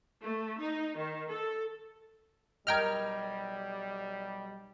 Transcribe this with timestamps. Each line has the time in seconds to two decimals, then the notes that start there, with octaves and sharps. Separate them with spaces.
0.24 A3
0.61 D#4
0.98 D#3
1.31 A4
2.67 B1 G3 A#4 D#5 G5 F6 G#6